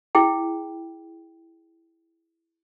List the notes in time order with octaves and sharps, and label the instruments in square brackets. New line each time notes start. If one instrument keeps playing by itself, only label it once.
[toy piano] E4 G#4 G5